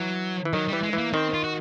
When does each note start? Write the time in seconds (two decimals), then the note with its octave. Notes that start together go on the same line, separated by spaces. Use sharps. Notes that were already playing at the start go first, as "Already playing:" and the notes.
Already playing: E3 F#3
0.45 E3
0.53 D#3 F#3
0.68 E3 G3
0.83 G#3
0.93 E3
0.98 A#3
1.13 D#3 C4
1.34 F4
1.44 F#4